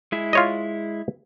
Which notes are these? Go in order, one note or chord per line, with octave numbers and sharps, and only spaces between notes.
G#3 E4
F4 C#5 D#5